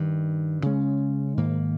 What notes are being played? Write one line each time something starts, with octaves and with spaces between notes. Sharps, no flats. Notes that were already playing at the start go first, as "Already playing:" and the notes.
Already playing: G2 D#3 G3
C#3 G#3 C#4
G#2 D#3 A#3